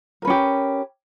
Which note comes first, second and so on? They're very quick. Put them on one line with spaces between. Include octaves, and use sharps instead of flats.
A#4 B4 C#4 G4